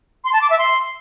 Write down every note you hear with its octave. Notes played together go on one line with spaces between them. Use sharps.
C6
A5
D6
E5
C6